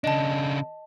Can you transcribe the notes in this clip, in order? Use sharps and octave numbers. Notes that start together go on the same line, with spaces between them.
C#3 D4 D#5 A5